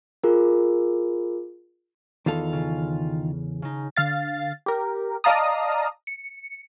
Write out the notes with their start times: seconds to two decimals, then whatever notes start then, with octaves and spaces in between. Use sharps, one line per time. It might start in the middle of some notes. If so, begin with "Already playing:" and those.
0.24 F4 G#4 A#4
2.26 E2 D#3 F4 A4 F5
2.53 C#3
3.62 C#3 D#4
3.97 D3 F5 A6
4.66 G4 A#4
5.24 D5 D#5 F5 A5 A#5 D#6
6.07 C#7